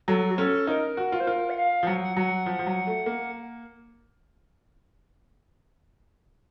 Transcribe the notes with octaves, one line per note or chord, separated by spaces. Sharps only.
F#3 A4
F#4
C#4 A4
D#4 A#4
F#4
F4
C5
F4 A#4
F#5
F5
F3
F#3 F#5
F#5
F#3 F#5
F3
F3
F#3
A3
A#3